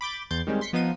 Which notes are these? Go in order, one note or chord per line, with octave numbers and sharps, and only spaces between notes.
B5 D6 G6 A6
E2 C6 G6 A6
D#3 G3 G#3 C4 C#4
C6 B6 C#7
F3 B3 D#4 F4 D#7